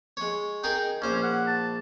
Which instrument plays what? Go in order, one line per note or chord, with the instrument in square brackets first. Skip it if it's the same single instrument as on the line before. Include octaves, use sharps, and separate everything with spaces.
[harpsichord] G#3 C#5
[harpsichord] D#4 G#4 A#4 [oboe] G5
[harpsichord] A#1 C5 [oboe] C#4
[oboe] F#5
A5